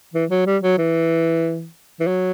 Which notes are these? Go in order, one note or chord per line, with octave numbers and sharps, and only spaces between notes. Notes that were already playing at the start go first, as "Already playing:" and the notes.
E3
F#3
G3
F#3
E3
E3
F#3